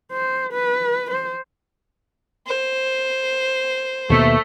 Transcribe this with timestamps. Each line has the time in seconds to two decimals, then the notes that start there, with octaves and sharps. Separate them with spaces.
0.12 C5
0.53 B4
1.11 C5
2.47 C5
4.10 D#2 B2 A3 A#3